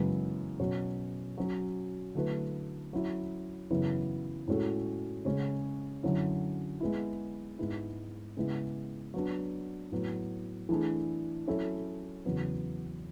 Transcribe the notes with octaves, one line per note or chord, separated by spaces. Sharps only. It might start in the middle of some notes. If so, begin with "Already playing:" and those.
Already playing: F#2 C#3 E3 G#3 B3
B2 F#3 C#4
F#3 C#4 F#4
D3 F#3 A3 E4 B4
F#3 C#4 E4
F#2 C#3 E3 B3 E4
A2 G#3 C#4 F#4 A4
C#3 G#3 C#4
F#2 D3 F#3 C#4 E4
G#3 B3 E4
G#2 G#3 B3 E4
C#3 G#3 B3 E4
F#3 B3 D4
A2 F#3 B3
E3 A3 D4 G#4
F#3 C#4 E4 A4
E2 C#3 F#3 B3